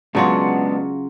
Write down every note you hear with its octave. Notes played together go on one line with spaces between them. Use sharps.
C#3 F#3 G#3 B3 D4 F4